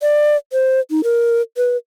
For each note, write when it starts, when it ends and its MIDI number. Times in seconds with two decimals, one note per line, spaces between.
0.02 0.36 74
0.53 0.80 72
0.91 1.01 63
1.04 1.41 70
1.57 1.77 71